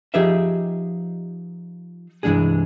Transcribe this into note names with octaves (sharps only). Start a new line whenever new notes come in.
F3 D#4 G4 G#4 B4 E5
C2 G2 E3 G#3 D4 G#4